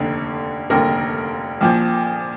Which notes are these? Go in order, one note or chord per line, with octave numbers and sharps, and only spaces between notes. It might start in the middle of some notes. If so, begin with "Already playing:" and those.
Already playing: F1 D#2 D3
F1 D#2 D3 A#4
A#1 A#2 F3